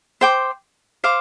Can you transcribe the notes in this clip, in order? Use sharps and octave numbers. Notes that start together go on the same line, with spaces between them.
C5 G5 D6
C5 F5 D6